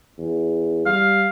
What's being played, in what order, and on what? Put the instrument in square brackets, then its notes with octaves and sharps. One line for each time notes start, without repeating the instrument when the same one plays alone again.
[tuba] E2
[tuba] G3 [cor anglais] F5